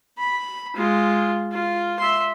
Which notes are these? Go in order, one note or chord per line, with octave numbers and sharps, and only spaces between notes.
B5
G#3 F4
F4
E5 C6